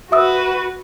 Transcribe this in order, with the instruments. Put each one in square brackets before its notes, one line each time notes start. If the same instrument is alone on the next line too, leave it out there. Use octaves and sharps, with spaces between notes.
[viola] F#4 B4 [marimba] E5 D#6 E6